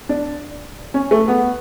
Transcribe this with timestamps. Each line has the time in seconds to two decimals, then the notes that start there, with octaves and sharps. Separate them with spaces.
0.09 D4
0.94 C#4
1.11 A3
1.28 B3